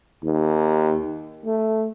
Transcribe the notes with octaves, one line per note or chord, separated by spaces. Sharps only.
D#2
A3